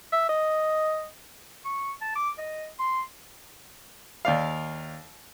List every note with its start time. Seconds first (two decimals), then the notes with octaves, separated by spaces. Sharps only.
0.12 E5
0.29 D#5
1.65 C#6
2.01 A5
2.16 D6
2.38 D#5
2.79 C6
4.25 D#2 D5 F5